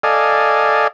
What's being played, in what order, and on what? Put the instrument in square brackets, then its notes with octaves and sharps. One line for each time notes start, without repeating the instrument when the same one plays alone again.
[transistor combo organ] A4 D5 D#5 F5 G#5